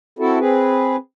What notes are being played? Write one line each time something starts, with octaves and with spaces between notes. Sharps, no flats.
C4 E4 F#4 A4
C4 G#4 B4